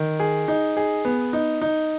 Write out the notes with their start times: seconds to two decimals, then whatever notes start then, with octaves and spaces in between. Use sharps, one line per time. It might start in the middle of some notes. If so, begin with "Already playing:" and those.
Already playing: D#3
0.20 G#4
0.48 D#4
0.77 G#4
1.05 B3
1.33 D#4
1.62 D#4